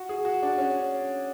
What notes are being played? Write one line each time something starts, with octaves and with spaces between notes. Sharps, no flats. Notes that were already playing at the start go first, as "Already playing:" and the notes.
Already playing: F#4
G#4
F#4
D4
C#4